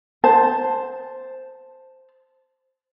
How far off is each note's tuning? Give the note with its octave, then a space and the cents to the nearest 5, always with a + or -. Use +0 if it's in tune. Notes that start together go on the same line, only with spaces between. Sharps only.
C5 +0 A5 +0